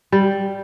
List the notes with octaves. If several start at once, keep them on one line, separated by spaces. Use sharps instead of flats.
G3